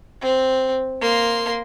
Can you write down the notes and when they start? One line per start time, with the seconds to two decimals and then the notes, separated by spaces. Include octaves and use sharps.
0.21 C4
1.01 A#3 C6